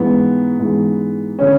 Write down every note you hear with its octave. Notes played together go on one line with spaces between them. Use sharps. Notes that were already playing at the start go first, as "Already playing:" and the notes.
Already playing: G#2 E3 B3
G#2 E3
D3 C#4